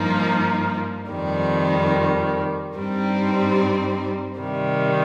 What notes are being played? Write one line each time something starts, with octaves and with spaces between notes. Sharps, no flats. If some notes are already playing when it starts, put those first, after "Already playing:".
Already playing: G2 F3 A#3 D#4
F2 D#3 G3
G2 G3 C4 D#4
C3 D#3 G3